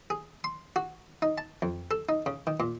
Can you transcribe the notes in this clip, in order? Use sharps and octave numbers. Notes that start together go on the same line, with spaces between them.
G#4
C6
F#4
D#4
A5
F2
A4
D#4
C#3
D#3
A#2